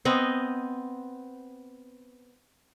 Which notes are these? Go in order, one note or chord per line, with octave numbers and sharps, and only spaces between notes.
B3 C4 D#5